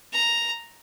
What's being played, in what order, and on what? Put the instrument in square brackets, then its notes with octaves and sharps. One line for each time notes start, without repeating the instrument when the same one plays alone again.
[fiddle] A#5